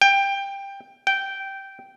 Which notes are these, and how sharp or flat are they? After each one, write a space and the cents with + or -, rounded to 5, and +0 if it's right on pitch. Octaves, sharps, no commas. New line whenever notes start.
G5 +15
G5 -10